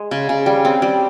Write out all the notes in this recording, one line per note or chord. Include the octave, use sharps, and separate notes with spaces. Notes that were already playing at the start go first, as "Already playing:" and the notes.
Already playing: G#3
C#3
C#3
G3
C4
G3